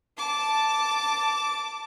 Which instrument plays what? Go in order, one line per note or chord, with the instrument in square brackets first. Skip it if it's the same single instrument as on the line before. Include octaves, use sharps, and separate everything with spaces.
[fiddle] A5 D6